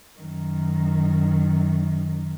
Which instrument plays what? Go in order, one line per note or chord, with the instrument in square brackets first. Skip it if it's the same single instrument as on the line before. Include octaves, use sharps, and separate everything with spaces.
[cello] F#2 D#3